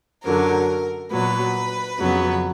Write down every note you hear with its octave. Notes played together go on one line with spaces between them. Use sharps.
F#2 D3 F#3 A#4
A#2 F#3 B3 B4
F2 C#3 F#3 B3